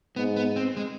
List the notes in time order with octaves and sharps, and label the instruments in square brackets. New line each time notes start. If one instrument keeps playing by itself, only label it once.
[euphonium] G#2 [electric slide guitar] B3
[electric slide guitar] B3
C4
G#3